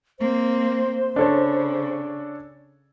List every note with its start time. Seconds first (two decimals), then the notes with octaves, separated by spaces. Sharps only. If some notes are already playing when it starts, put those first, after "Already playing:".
0.20 A#3 C4 C5
1.16 C#3 D4 A4 C#5